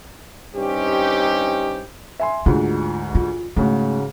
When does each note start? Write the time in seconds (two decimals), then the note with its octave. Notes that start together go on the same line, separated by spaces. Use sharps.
0.55 G2 C4 C#4 D#4 G4
2.20 E5 G#5 C6
2.46 D2 G#2 F4
3.15 F4
3.56 G#2 C#3 A3 F#4